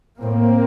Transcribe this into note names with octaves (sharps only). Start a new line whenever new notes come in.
A2 A#3 C4